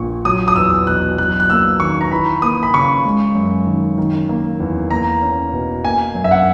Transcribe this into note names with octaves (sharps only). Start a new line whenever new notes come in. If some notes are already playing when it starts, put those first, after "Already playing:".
Already playing: A#1 A#2 A#3 C#6
F#3 D#6
D#6
E2 E6
B2 F#6
F#3 F#6
F#6
A#3 E6
D#3 C#6
A#5
E3 B5
A#3 D#6
B5
C#3 C#6
G#3
F#2
D#3
D#3
A#3
E2
A#3 A#5
C#4
B2
A#3 G#5
F#2
E5
F#5